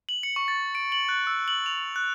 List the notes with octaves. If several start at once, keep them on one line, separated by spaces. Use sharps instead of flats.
F#7
C#7
C#6
A6
D7
F#7
F#6
E6
F#7
F7
F#6